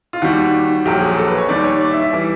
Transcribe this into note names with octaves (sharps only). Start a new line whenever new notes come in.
F4
D#2 D#3 G3 F#4
A#1 A#2 F#3 G4
G#4
A4
B4
C#5
D#2 D#3 G3 D5
C#5
D5
E5
E5
E3 G3